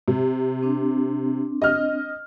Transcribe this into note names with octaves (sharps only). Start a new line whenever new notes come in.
C3
C4 D4
D#5 F6